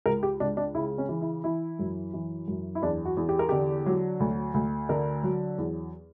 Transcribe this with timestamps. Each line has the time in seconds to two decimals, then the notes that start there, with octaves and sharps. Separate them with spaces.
0.06 C#2 A#4
0.23 G4
0.40 C#2 D4
0.57 D4
0.74 C#3 E4
0.98 C#4
1.09 E3
1.22 E4
1.44 E3 E4
1.79 F#2
2.13 E3
2.48 F#2
2.75 E4
2.82 E2 D4
3.05 F#4
3.17 E2
3.29 G4
3.39 A#4
3.49 D3 G4
3.86 F#3
4.20 D2
4.54 D2
4.89 D3 A#4
5.23 F#3
5.58 E2